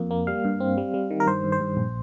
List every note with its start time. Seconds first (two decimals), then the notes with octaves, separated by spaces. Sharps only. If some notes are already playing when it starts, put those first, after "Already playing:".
Already playing: F2 A#3
0.11 A#3
0.27 G3 F5
0.45 G2
0.60 C4
0.77 G3
0.94 G3
1.10 D#3
1.20 A#4
1.27 G2 C5
1.44 G2
1.52 C5
1.61 G2
1.77 A#1